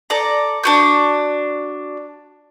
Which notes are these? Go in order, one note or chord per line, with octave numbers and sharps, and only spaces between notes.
A4 D5 A#5
D4 F#4 G6